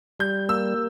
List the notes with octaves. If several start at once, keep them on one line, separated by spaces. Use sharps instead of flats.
G3 G6
A#3 E6